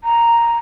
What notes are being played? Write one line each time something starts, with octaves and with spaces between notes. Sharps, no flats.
A#5